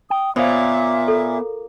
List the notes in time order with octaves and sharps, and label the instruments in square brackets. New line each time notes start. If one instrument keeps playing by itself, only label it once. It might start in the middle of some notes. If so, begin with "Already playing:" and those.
[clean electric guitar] G5 [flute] D#6
[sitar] A#2 [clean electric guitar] B3 C#5 F5 [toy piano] C5 [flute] E5
[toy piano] A4